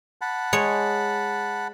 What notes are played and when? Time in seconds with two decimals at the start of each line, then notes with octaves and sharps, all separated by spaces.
0.21 F#5 A5 B5
0.53 G#3 C#5